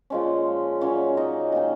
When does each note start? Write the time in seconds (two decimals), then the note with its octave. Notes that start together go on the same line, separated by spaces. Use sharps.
0.10 A#2 F3 G#3 C#4
0.81 A#2 F#3 A#3 C#4 C#5
1.17 D#4 D#5
1.52 D#3 A#3 C#4